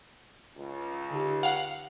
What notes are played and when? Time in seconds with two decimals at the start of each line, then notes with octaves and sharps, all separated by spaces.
0.57 C#2
1.10 D3 D#4 G4
1.43 F5 F#5